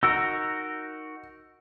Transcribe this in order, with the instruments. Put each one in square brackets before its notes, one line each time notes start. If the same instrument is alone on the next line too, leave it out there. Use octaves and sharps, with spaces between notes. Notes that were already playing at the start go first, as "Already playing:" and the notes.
[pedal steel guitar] D#4 F#4 A#4 [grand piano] E6